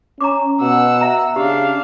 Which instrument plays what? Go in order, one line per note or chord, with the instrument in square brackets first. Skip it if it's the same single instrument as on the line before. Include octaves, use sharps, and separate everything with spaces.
[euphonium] C#4 [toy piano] A#5 C#6 D6
[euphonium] B2 [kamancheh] F#5 E6
[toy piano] E5 A#5
[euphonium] C#3 [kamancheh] D4 F5 [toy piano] G4